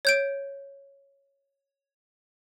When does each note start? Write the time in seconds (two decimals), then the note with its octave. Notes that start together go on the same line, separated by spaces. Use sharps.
0.05 C#5 G6 D7